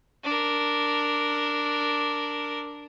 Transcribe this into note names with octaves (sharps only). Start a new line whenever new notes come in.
D4 A#4